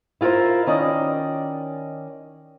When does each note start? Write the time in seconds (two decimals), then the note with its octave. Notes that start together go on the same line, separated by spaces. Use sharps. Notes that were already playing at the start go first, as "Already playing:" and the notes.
0.21 E4 F4 A4 A#4 C5
0.67 D#3 C#4 D5 D#5